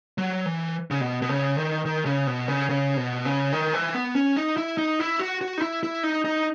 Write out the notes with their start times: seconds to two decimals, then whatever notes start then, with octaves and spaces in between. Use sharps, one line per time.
0.18 F#3
0.46 E3
0.91 C#3
1.01 B2
1.22 B2
1.29 C#3
1.58 D#3
1.85 D#3
2.06 C#3
2.27 B2
2.48 C#3
2.69 C#3
2.97 B2
3.25 C#3
3.53 D#3
3.74 E3
3.95 B3
4.15 C#4
4.36 D#4
4.57 E4
4.78 D#4
4.99 E4
5.19 F#4
5.41 F#4
5.58 D#4
5.62 E4
5.83 E4
6.03 D#4
6.25 D#4